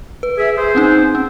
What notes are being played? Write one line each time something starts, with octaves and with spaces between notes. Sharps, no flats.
B4
G#4 E5
G#4 C5
C4 C#4 D#4
C#4